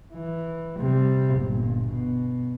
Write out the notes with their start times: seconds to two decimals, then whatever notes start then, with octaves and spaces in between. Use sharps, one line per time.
0.14 E3
0.80 C3 G3
1.37 G1 A#2
1.88 B2